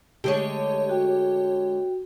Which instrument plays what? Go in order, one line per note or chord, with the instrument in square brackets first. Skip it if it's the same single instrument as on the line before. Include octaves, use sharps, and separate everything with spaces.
[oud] D3 G#3 A3 [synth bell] G4 C#5
[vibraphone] F#4 G5